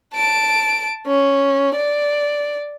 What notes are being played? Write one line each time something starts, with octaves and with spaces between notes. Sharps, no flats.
A5 D7
C#4
D5